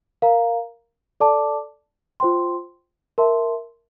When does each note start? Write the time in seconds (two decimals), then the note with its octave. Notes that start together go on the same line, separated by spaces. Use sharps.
0.22 A#4 F5 A#5
1.20 A4 D5 A5 D6
2.20 F4 C5 G5 C6
3.18 A#4 E5 A5 C6